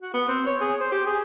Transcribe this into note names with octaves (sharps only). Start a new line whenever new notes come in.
F#4
B3
C4
C#5
G#4
C5
G4
G#4